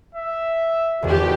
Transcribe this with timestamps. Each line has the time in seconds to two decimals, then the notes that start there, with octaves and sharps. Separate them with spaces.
0.14 E5
1.02 G#1 E2 F#4 G4